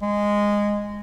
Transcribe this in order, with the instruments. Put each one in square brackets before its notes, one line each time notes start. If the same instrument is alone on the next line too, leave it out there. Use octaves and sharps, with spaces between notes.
[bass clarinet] G#3